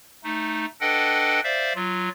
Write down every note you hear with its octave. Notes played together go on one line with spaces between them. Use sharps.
A3 D#4
D4 A4 B4 D#5 F#5 G5
C5 D5 E5 F5
F#3 F4